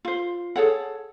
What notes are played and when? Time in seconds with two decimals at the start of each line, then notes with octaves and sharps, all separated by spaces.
0.05 F4 C5
0.56 G#4 A4 C#5 F#5